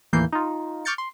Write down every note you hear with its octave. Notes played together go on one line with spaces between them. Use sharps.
D#2 A2 E3 A#3 G6 C7
D#4 F4
C#6 D6 F6 G6 A6 C#7
C6